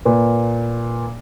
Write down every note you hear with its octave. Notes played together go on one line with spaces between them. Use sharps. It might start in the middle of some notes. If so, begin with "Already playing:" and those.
A#2 B4